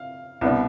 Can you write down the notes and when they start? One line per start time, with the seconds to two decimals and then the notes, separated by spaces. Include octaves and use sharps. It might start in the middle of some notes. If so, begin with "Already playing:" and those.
Already playing: F5
0.41 C2 B2 B3 D4